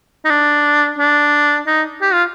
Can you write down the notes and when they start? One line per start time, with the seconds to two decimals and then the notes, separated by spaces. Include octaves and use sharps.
0.25 D#4
0.30 D4
0.98 D4
1.67 D#4
2.01 G4
2.13 F4